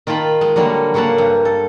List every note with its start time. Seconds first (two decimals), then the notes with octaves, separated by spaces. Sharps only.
0.07 D#3 F4 G5 A5 B5
0.41 G#3
0.56 D3 F#3 G3 A#3
0.94 C#3 F#3 A#3 F#5 A5
1.18 G2
1.45 A4